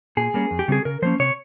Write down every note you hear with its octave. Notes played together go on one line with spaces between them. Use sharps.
A#2 G#4
G3 A#3 C#4
F2
G4
C#3 G3 C4 G#4
C#3 A#4
F3 A#3 C#4 C5
C3 C#5